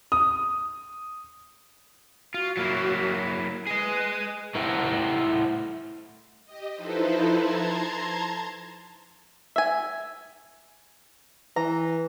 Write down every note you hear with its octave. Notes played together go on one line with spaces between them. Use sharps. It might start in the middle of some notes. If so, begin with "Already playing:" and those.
D#6
F4 F#4
F#3 A#3 E4
G#4 B4 D#5
A3 E4 A#4 C5 F#5 G5
G4 D#5
F3 D#4 E4 A4 B4 C5
A5 A#5 C6 G#6
E5 G#5
E3 A#5